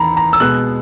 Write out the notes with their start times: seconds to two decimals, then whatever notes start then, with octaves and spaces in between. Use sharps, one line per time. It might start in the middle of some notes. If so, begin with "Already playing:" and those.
Already playing: E2 D#3 A#5 B5
0.17 A#5
0.33 E6
0.40 B2 G#3 B3 F#6